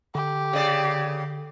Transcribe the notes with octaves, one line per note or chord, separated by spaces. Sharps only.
D3 G4
C#3 D5